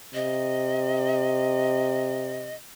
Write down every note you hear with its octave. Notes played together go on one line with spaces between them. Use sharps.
C3 D#5